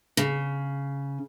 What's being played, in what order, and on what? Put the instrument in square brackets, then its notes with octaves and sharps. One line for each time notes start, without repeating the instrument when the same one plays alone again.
[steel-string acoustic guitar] C#3